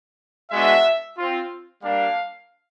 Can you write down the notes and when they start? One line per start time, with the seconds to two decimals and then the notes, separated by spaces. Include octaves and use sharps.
0.50 G#3 B3 D4 F#4 E5
1.17 C4 F4
1.82 G3 A#3 D4 F5